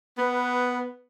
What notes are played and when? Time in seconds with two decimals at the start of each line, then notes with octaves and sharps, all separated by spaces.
0.18 B3 B4